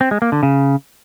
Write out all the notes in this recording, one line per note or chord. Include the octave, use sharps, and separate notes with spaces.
C4
G#3
A#3
D3
C#3